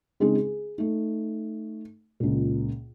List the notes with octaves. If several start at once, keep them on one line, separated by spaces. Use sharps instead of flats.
C#3 G#3 C4 C#4 D#4 G#4
G#4
A3 D#4
C#2 A#2